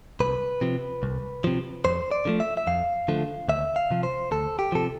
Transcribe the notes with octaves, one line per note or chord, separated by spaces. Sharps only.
C2 B4
C3 F3
C2
C3 F3
F2 C5
D5
D3 F3 A3
E5
E5
F2 F5
D3 F3 A3
D2 E5
F5
C3 F3
C5
D2 A4
G4
C3 F3 A4